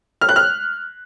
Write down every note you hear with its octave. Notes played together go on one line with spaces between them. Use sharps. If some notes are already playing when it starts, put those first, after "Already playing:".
F6
F#6
F6